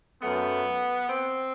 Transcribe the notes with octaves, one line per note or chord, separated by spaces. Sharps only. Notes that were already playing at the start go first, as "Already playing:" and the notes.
F#2 F#3 A3 B3
C4